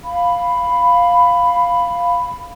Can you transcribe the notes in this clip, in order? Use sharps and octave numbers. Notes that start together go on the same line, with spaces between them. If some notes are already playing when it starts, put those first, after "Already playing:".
F5 B5